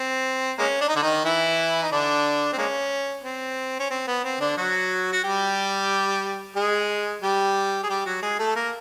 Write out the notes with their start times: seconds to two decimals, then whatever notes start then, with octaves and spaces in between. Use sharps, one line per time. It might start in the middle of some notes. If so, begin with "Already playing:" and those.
Already playing: C4
0.59 G#3 A#3 C#4
0.81 D4
0.88 D#4
0.96 D3 D4
1.02 D#3 D#4
1.24 E3 E4
1.83 D#4
1.92 D3 D4
2.52 C4
2.58 G#3 A#3 C#4
3.24 C4
3.80 C#4
3.90 C4
4.07 B3
4.24 C4
4.40 D3 D4
4.57 F#3 F#4
5.13 F#4
5.24 G3 G4
6.56 G#3 G#4
7.22 G3 G4
7.83 G#4
7.89 G3 G4
8.06 F#3 F#4
8.22 G#3 G#4
8.39 A3 A4
8.56 A#3 A#4